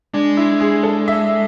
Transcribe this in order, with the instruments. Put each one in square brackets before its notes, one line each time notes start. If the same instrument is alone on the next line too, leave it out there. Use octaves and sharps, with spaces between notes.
[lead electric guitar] G#3 [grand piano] D4
[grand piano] E4
G#4
A4
E5